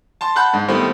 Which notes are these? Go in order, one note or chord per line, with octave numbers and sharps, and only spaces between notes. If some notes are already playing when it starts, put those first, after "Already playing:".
A5 C6
F#5 A5 B5 F#6 G6
G#2
D#3 G3 A3 B3 C4 E4